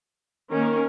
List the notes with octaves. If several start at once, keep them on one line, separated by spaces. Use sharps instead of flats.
D#3 A#3 C#4 A#4